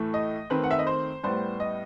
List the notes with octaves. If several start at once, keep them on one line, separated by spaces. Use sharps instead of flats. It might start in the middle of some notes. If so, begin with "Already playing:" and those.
Already playing: A2 E3 A3
D#5
D#3 A3 C4 B4
F#5
E5
D#5
C5
A2 G3 B3 C5
D#5